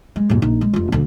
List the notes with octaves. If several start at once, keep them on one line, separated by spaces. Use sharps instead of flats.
G#3
D#1 G#2
A#1 D#4
G#3
F1 F4
D2 D3